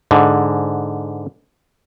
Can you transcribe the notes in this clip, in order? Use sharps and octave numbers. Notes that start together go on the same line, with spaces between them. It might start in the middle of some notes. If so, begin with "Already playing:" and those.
G#2 D3